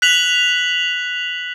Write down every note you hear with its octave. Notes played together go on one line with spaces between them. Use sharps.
F#6 B6 F7 F#7